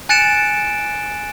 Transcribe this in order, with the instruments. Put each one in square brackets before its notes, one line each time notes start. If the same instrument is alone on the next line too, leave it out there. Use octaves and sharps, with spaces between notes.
[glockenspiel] G#5 F#6 A6 C#7 D7 E7